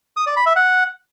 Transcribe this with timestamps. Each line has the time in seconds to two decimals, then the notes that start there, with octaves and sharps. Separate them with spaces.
0.17 D#6
0.27 D5
0.36 B5
0.46 E5
0.56 F#5